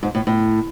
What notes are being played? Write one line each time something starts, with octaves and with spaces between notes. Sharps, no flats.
G#2
A2
A2